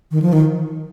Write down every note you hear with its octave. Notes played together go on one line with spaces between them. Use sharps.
D#3
F3
D#3